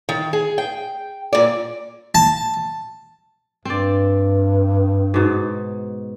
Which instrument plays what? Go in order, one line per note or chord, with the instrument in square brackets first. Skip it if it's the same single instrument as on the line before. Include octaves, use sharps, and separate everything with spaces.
[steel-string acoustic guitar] D#3
G#4
G5
A#2 D5
[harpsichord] A5
[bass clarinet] G2 [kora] C4 D5
[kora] G#2 B2